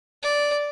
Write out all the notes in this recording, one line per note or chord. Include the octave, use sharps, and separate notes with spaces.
D5